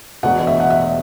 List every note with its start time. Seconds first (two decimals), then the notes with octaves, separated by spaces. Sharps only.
0.23 E1 E2 B2 F#5
0.47 E5
0.60 F#5
0.70 E5